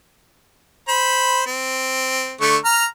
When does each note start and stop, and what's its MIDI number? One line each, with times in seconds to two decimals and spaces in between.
0.89 1.43 72
0.89 1.43 83
1.46 2.34 60
2.41 2.57 50
2.41 2.57 57
2.41 2.57 85
2.65 2.86 82
2.65 2.86 89